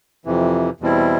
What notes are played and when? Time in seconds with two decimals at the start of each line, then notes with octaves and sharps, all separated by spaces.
0.25 F2 C3 E3
0.80 E2 B2 G3 C4 E4